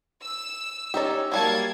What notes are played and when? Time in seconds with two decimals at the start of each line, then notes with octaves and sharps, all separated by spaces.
0.22 E6
0.94 C#4 D#4 G4 D5 E5
1.32 F#3 G3 A#3 F5 A5 G#6